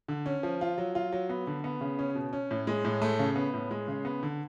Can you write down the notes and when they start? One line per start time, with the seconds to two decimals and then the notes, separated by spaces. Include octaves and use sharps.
0.08 D3
0.26 C#4
0.43 F3
0.61 F4
0.78 F#3
0.95 F4
1.12 F#3
1.29 B3
1.47 D3
1.64 B3
1.81 C#3
1.99 C#4
2.15 B2
2.33 C#4
2.51 A2
2.67 G#3
2.85 A2
3.02 A3
3.19 C#3
3.36 B3
3.54 A2
3.71 G#3
3.88 C#3
4.05 B3
4.23 D3